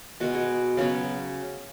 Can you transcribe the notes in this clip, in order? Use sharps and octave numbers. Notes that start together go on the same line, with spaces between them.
B2 G#3 B3 F#4
G#4
C#3 F#3 B3